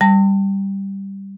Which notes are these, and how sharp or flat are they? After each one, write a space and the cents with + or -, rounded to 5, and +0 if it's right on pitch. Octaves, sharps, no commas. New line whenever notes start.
G3 +0 A5 +40